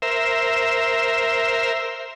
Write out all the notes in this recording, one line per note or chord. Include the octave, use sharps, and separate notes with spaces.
A#4 C5 E5